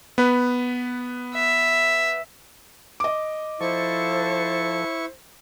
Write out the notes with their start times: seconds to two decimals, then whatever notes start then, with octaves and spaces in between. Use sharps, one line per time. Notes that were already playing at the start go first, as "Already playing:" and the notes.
0.18 B3 B4
1.35 E5
3.00 D#5 D6
3.61 F3 E4 A4 C5 C#6